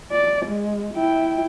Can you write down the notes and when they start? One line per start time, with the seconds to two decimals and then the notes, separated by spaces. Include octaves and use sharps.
0.11 D5
0.45 G#3
0.94 E4 G5